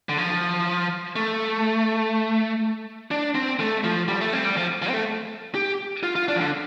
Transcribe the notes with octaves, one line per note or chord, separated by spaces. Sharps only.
D3
F3
A3
D4
C4
A3
F3
G3
A3
C4
G3
F3
F3
C4
A3
G4
F4
F4
D4
F3
D3